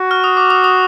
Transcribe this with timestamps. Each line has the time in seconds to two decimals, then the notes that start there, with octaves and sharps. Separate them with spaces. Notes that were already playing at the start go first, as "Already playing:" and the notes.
Already playing: F#4
0.11 F6
0.24 D#6
0.37 D6
0.50 D#6
0.64 D#6